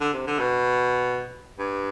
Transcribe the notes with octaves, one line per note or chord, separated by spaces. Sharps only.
D3
C3
D3
B2
G2